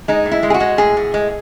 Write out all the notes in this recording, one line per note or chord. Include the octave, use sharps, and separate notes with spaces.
G#3 D#4
A2
E4
G#3
G#4
F#4
G#3
A2 G#4
A2
G#3